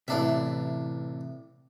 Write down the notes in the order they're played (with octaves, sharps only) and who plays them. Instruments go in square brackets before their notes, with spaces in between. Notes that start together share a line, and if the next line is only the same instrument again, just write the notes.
[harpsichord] A1 D4 E5 [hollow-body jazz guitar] C3 E3